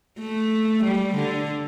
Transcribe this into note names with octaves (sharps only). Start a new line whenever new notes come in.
A3
G3
D3